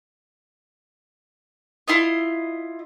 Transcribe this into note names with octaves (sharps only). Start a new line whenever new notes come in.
E4 F4 D#5